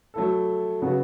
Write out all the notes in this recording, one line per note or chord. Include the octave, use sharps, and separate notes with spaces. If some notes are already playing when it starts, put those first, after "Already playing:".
F#3 A3 E4 A4
C#3 F#3 B3 F#4